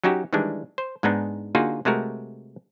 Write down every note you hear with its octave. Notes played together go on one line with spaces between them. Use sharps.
F#3 C#4 D#4 F#4 G4
D#3 E3 G3 G#3 D4
C5
G#2 G#3 B3 D4 D#4
D3 A#3 D#4 F4 F#4 G#4
C3 G#3 A3 F#4 A#4